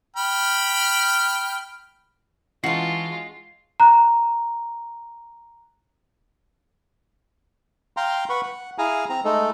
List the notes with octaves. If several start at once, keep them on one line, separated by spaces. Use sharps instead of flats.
G5 B5 F6
E3 G#3 C#4 D#4 F4 F#4 A5 C7
A#5 F#6
F5 G5 A#5 C6
B4 F#5 B5 C#6
F#5
E4 G#4 F5 G#5 A#5
C4 A#5
G#3 A3 D#4 A4